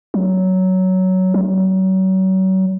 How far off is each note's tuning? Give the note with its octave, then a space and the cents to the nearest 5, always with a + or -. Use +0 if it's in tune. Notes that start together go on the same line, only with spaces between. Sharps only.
F#3 +10
F#3 +35